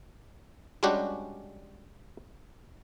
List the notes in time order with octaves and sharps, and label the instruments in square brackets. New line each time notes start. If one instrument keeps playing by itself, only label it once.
[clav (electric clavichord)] G3 G#3 C#4 D4 F#4 G4